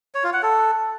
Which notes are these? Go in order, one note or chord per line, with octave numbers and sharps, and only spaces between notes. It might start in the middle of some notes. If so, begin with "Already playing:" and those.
C#5
F4
F#5
A4